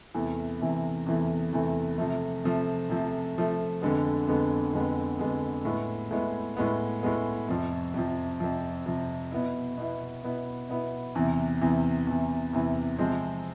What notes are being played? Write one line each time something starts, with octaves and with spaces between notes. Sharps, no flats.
E2 C3 E3 A3
E2 C3 E3 A3
E2 C3 E3 A3
E2 C3 E3 A3
C3 F3 A3
C3 F3 A3
C3 F3 A3
C3 F3 A3
F2 D3 G#3 B3
F2 D3 G#3 B3
F2 D3 G#3 B3
F2 D3 G#3 B3
A2 G#3 B3
A2 G#3 B3
A2 G#3 B3
A2 G#3 B3
F2 C3 F3
F2 C3 F3
F2 C3 F3
F2 C3 F3
B2 B3 E4
B2 B3 E4
B2 B3 E4
B2 B3 E4
E2 C3 E3
E2 C3 E3
E2 C3 E3
E2 C3 E3
C3 F3 G#3 C4